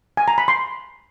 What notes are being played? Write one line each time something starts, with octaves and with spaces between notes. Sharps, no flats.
G#5
A#5
B5
C6